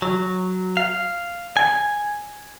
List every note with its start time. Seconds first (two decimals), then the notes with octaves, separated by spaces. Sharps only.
0.02 F#3
0.77 F5
1.57 G#5